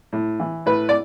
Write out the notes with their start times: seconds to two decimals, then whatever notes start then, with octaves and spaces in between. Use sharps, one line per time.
0.13 A2
0.40 E3
0.66 A2 B4
0.89 D5